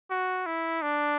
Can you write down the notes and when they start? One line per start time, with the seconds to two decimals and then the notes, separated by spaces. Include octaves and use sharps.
0.11 F#4
0.46 E4
0.82 D4